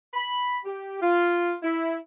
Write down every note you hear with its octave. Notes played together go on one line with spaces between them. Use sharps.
B5
G4
F4
E4